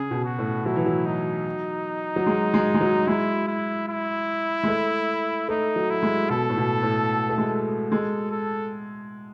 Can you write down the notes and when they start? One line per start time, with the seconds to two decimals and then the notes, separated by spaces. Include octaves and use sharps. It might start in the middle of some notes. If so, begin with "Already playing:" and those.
Already playing: C#3 G#4
0.11 B2
0.24 F#4
0.39 A2
0.66 F#3 E4
0.76 E3
0.86 F#3
1.06 D#4
2.16 F#3
2.27 G#3
2.54 G#3
2.74 G#3
2.81 F#3
3.07 G#3 E4
3.48 E4
3.88 E4
4.64 G#3
4.68 A3
5.49 A3 D#4
5.76 F#3
5.90 E4
6.03 G#3
6.30 B2 A4
6.49 A2
6.57 B2
6.83 A2
7.30 A3
7.38 G#3
7.91 G#3 A4
8.31 A4